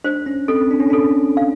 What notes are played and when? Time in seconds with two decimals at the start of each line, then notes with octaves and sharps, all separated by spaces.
0.04 D4 C5
0.26 C#4
0.48 C4 A4
0.71 D4
0.80 C#4
0.90 D4 A4
1.37 F5